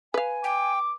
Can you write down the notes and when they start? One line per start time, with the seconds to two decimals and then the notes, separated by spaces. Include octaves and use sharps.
0.14 B4 F5 G#5
0.44 G5 D6